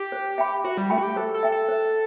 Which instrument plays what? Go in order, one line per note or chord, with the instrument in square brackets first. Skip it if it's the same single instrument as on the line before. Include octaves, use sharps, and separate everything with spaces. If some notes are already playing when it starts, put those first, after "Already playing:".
Already playing: [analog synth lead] G4
[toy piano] C5
E5 G5 B5
[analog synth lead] F#4 [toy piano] C5
[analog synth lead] G3
[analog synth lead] A3 [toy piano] E5 G5 B5
[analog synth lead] F#4
G4
[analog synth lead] A4 [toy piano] C5
[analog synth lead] A4
[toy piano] E5 G5
[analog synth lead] A4
[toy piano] C5